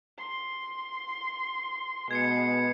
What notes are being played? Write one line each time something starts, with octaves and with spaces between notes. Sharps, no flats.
C6
B2 G#3 G#6 C7 C#7